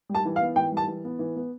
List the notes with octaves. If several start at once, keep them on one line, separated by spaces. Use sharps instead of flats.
G3
A5
E3
F5
B3
E3 G5
G3
A5
E3
B3
E3
B3